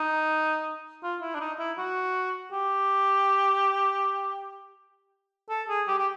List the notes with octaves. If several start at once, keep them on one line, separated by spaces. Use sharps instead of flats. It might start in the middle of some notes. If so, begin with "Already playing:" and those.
Already playing: D#4
F4
E4
D4
D#4
E4
F#4
G4
A4
G#4
G4
G4